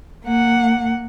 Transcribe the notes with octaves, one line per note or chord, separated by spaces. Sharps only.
A#3 F#5